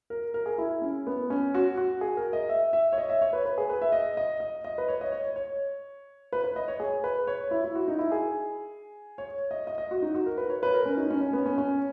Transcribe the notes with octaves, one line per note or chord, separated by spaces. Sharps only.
A#4
A#4
G#4
E4
C#4
B3
C#4
F#4
F#4
G#4
A#4
D#5
E5
E5
C#5
D#5
E5
C#5
B4
B4
G#4
B4
E5
D#5
D#5
D#5
D#5
B4
C#5
D#5
C#5
C#5
C#5
B4
B4
D#5
C#5
G#4
B4
C#5
E4
E4
F#4
D#4
E4
G#4
C#5
D#5
D#5
D#5
F#4
D#4
F#4
A#4
B4
C#5
B4
A#4
C#4
D#4
C#4
C#4
B3
C#4
C#4